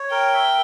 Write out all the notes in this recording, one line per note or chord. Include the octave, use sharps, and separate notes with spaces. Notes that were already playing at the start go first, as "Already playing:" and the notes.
Already playing: C#5
A#4 G5
E5